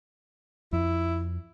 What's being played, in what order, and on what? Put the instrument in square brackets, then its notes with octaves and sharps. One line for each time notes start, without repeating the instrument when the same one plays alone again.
[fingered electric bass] F2 [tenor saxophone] E4